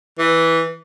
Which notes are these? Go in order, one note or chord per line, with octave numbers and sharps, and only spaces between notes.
E3